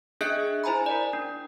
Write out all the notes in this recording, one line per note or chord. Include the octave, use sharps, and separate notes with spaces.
D4 G#4 D#5 E5 F#6 C#7
E4 C5 G#5 A#5 B5
A#4 D5
D4